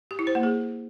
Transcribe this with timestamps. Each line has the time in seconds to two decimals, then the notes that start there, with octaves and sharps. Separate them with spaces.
0.11 G4
0.19 E4
0.27 C5
0.35 A#3
0.43 G#4